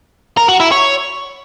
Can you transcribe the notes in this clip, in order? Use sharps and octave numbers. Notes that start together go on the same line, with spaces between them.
A#4
F#4
E4
C#5